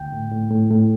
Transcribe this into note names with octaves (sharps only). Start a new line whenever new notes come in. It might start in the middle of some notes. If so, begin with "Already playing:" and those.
Already playing: D2 G5
A2
A2
A2
A2